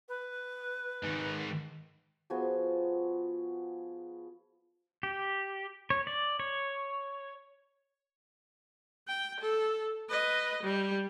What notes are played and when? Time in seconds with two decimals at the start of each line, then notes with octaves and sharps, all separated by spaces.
0.09 B4
1.03 G#2 D#3
2.30 F3 B3 F#4 G#4
5.03 G4
5.90 C#5
6.07 D5
6.40 C#5
9.08 G5
9.40 A4
10.09 B4 D#5
10.63 G3